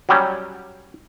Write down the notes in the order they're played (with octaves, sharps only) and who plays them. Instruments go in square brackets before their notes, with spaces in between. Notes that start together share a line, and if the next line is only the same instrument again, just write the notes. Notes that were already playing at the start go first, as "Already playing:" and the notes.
[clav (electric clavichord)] F#3 G3 C#4